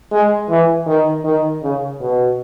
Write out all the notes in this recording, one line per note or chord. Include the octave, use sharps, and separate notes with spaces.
G#3
E3
D#3
D#3
C#3
B2